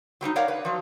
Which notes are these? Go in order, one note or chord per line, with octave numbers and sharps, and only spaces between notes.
F#3 G3 A#3 D#4
A#4 C#5 D5 F5 F#5
B4
F3 F#3